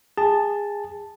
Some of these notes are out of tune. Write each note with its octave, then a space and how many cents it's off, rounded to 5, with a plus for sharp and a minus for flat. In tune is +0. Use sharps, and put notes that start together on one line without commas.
G#4 -20 A5 +0